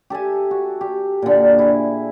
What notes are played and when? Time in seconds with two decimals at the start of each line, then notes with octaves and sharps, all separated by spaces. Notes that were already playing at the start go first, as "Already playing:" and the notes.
0.10 G4 A4 E5 G#5
0.51 F#4
0.81 G4
1.22 A#2 D3
1.59 E4 G#4